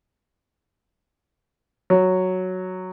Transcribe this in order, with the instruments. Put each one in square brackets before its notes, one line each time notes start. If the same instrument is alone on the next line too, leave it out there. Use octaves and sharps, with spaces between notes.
[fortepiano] F#3